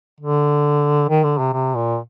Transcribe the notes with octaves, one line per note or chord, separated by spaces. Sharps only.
D3
D#3
D3
C3
C3
A#2